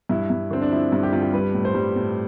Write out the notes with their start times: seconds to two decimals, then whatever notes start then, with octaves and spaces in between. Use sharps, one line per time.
0.09 G2 E4
0.30 G2
0.51 D3 C4
0.62 D4
0.71 F3 E4
0.92 G2
1.03 G4
1.12 G2 F4
1.22 G4
1.33 G3 B4
1.54 A2
1.65 C5
1.75 G3
1.96 A2